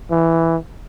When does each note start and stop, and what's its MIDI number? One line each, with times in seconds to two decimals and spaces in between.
0.11 0.57 52